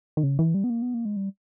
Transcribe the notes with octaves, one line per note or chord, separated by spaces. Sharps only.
D#3
C#3
E3
G3
B3
A#3
B3
A#3
G#3
G3